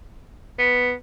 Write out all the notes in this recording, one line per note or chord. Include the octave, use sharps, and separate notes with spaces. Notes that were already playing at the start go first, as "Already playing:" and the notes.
B3